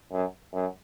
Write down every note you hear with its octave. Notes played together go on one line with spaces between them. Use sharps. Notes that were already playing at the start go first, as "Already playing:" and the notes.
F#2
F#2